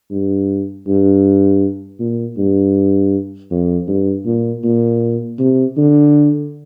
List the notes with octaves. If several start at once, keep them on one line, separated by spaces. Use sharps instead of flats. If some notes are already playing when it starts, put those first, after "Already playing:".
G2
G2
A#2
G2
F2
G2
A#2
A#2
C3
D3